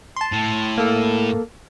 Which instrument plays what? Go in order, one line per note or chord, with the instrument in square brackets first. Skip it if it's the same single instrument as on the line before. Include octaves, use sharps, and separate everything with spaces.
[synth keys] A5 C6
[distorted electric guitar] A2
[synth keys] A#3 A4